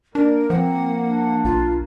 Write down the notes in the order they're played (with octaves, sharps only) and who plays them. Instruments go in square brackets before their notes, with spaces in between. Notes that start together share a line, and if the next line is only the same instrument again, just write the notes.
[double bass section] A#3 [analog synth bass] D4 [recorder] A#4 [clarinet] D5
[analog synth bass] F3 [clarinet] C4 [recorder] F#5
[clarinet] D4
[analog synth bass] B1 [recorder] F4